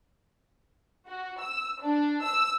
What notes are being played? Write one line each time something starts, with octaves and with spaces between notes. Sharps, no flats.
F#4
E6
D4
E6